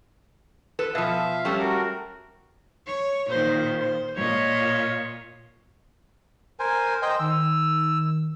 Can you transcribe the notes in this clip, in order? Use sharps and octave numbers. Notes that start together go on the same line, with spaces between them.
A4 B4
B2 F3 E5 F5
G3 A3 C#4
F#4 A#4
C#5
A#2 D#3 C5
C5
A#2 C#5 D#5
A#4 C5 G#5
C5 D#5 G5
D#3 E6